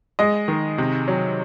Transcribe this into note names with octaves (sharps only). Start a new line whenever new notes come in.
G#3 D#5
D#3
C3
F#3